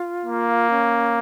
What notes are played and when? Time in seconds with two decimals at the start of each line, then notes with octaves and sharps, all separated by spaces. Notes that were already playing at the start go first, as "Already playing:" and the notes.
Already playing: F4
0.25 A#3
0.70 C#4